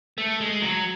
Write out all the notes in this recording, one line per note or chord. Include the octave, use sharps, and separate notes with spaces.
A3
G#3
F#3